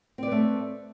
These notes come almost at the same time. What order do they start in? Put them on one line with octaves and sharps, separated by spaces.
C4 D5 B4 A3